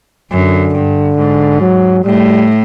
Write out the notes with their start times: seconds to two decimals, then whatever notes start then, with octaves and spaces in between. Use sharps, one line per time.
0.31 F#2 D3
0.75 G2
1.18 G#2
1.61 F#3
2.04 A2 G3